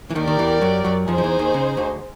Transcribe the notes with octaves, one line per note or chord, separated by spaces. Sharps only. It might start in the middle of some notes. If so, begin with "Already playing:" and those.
E3
D#2 D#3 G4 A#4 D5
D#3
E2 E3
F#2 F#3
F#2 F#3
F2 F3 D#4 G#4 C5
F3
E2 E3
D#2 D#3
C#3
D2 D3